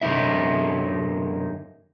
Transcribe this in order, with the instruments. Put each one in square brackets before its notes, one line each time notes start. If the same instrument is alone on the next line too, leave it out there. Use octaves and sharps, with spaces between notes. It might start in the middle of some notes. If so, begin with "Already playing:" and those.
[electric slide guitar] F#2 D3 D#3 D#4 E5